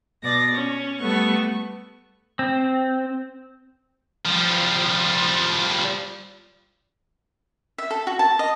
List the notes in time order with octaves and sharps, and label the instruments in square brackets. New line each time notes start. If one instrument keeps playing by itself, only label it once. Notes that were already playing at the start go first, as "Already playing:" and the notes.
[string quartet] B2 D5 A#6
C#4
G3 A3 B3 C#6
[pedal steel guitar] C4
[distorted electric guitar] F3 G3
[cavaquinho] E5
A4
F#4
A5
D#5